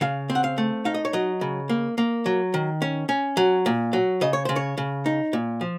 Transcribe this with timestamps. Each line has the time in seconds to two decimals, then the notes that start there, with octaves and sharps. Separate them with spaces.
0.01 C#3 F5
0.30 C4
0.35 F#5
0.44 F5
0.58 A3
0.85 D#4 F5
0.94 D#5
1.05 C#5
1.13 F#3 D#5
1.41 C#3
1.69 A#3
1.98 A#3
2.26 F#3
2.54 D#3
2.82 C#4
3.09 C#4
3.37 F#3
3.66 A#2
3.93 F#3
4.21 C#3 D#5
4.33 C#5
4.45 C#3 C5
4.56 C#5
4.77 C#3
5.06 D#4
5.33 A#2
5.61 F3